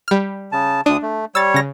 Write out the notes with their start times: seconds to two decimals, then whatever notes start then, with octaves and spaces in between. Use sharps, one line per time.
0.08 G3 F6
0.52 C#3 A5
0.86 D2 D4 D#6
1.02 A3
1.35 G3 C#5 E6 A6
1.54 C#3 A#6